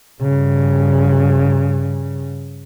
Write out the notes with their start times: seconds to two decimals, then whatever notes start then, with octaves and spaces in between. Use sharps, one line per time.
0.21 G2 C#3